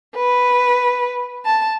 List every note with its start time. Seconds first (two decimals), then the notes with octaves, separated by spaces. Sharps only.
0.16 B4
1.45 A5